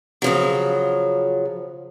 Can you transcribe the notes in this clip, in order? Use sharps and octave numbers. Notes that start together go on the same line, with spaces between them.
C#3 F3 F#3